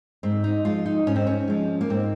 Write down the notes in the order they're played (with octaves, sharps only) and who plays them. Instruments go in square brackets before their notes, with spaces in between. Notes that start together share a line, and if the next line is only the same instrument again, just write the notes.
[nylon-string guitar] G#2 C4
D#4
F3 G#3 F4
D#4
G#2 C#4
C4
C#4
F3 G#3
A#3
G#2 C4